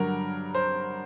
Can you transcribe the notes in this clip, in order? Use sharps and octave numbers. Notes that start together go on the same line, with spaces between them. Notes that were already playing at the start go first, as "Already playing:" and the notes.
Already playing: G2 D3 F#3 A#4
C5